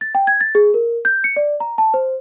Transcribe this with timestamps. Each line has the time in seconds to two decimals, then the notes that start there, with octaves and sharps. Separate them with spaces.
0.01 A6
0.15 G5
0.27 G#6
0.41 A6
0.55 G#4
0.74 A#4
1.05 G6
1.24 C#7
1.36 D5
1.60 A#5
1.78 A5
1.94 C5